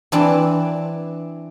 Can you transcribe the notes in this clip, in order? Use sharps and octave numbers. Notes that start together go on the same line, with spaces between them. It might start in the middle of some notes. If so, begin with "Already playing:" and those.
E3 C4 D4 E4 D5 A5